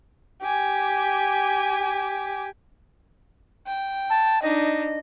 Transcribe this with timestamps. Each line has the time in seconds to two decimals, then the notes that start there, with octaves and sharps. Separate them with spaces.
0.42 G4 G#5
3.66 G5
4.10 A5
4.42 D4 D#4 D#5